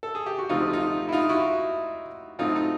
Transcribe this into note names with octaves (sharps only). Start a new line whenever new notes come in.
A4
G#4
G4
F#4
D2 C3 F3 A3 D#4 F4
D#4 F4
E4
D#4 F4
E4 F#4
A2 F#3 A3 C4 D#4 F4
D#4